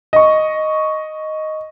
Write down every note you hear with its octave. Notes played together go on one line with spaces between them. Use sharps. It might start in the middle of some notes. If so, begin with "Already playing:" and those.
D#5 C#6